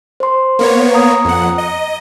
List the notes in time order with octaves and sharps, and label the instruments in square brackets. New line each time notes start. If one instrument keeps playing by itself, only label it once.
[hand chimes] C5 C6
[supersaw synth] A#3 B3 C#5
[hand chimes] A#5 D#6 G#6
[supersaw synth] F2 F#5
D#5